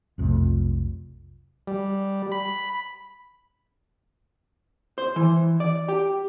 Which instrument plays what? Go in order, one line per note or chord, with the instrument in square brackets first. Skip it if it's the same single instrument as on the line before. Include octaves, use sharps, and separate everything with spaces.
[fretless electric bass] B1 F2 C3 A3
[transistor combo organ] G3
B5
[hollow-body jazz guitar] C5
E3
D5
G4